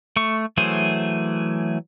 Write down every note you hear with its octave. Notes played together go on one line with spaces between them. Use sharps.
A3 C#6
E3 F#3 A3 G#4 C5